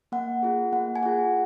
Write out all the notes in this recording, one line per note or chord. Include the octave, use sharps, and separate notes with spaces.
A#3 F#5
F4 G#4
A#3 F#5
G#5
F4 G#4 F#5